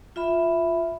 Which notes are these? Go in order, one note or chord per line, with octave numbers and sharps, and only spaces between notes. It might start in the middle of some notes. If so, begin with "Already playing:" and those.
F4 E5 B5